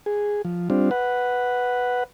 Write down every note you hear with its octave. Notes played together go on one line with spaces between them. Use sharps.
G#4
F3
G3 C4 D4 F4
B4 F#5